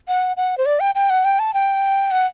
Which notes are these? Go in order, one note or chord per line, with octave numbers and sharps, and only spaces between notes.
F#5
F#5
C5
D5
G5
G5
F#5
G5
A5
G5
F#5